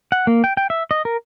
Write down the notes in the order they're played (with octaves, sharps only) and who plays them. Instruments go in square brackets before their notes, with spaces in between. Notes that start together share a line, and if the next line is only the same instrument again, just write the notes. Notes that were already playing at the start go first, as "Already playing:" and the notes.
[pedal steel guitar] F#5
A#3
G5
G5
E5
D#5
A#4